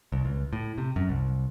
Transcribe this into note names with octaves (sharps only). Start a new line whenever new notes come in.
C2
C#2
A2
C3
F#2
C2